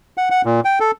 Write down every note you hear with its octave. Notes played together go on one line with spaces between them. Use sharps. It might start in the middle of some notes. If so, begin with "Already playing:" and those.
F#5
F#5
A#2
G5
A4